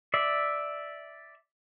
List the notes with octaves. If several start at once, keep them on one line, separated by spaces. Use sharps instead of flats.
D5 E5